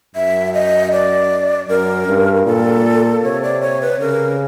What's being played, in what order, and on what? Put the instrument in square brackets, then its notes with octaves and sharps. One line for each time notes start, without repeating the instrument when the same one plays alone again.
[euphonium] F#2 [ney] E5
[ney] D#5
D5
[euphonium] F#2 [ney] A#4
[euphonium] G2
[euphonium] A#2 [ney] A4
[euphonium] C3 [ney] C#5
[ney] D5
C#5
B4
[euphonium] C#3 [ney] A#4